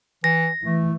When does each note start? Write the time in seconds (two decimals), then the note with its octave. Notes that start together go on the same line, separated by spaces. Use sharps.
0.24 E3 A#6
0.65 E3 A3